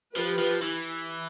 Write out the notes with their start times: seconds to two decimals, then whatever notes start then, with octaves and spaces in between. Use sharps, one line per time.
0.16 F3 G4 B4
0.39 F3
0.62 E3